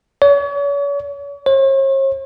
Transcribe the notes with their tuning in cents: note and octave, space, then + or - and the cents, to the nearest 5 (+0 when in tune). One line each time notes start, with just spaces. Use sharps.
C#5 +40
C#5 -45